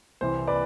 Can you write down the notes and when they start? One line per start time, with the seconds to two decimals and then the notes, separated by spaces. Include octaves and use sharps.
0.21 C2 C3 E3 C5
0.47 B4 D5